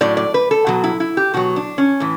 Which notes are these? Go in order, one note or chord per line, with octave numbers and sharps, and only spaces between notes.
A2 F#3 D5
D5
B4
A4
B2 F#3 F#4
E4
E4
G4
B2 F#3 F#4
D4
C#4
A2 E3